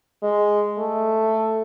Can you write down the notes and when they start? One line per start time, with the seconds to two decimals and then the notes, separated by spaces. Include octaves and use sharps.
0.22 G#3
0.79 A3